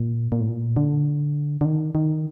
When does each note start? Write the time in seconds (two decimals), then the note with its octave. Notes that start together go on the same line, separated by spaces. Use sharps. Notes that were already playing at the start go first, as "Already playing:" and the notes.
Already playing: A#2
0.32 A#2
0.41 A2
0.49 A#2
0.76 D3
1.61 D3
1.65 D#3
1.95 D#3